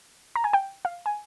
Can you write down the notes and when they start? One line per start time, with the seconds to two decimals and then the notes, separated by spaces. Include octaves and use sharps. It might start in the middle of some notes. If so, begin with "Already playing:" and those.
0.36 A#5
0.44 G#5
0.53 G5
0.85 F5
1.06 G#5